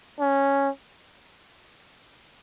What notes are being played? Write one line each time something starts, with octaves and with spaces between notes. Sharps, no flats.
C#4